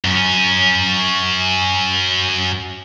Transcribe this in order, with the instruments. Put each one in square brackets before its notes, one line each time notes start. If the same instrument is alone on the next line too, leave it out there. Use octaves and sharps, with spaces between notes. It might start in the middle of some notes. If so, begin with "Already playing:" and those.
[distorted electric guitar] F#2 C#4